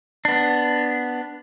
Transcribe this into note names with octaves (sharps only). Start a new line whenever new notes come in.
B3 D4